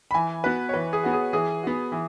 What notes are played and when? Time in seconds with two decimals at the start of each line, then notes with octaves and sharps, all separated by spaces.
0.11 B5
0.14 E3 G#5
0.44 B3 F#4 B4
0.69 C#5
0.74 E3 B4
0.93 G#4
1.03 B3 F#4
1.13 G#4
1.33 E3 G#4
1.63 B3 F#4
1.92 E3